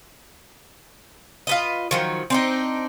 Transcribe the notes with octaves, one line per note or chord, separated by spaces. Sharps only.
F4 B4 D#5
D#3 F3 F#3
C4 D4 D#4